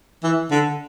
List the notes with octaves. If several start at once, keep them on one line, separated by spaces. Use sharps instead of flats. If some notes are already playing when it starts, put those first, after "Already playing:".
E3
D3